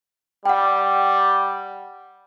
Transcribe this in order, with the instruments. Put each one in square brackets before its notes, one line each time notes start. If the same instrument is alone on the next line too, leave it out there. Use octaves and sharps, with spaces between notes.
[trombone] G3 [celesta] F#5 G5